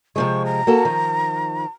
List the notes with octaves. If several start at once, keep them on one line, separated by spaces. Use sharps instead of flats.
C3 F3 G#3 C#6
A#5
A#3 F#4 A4
D#3 F3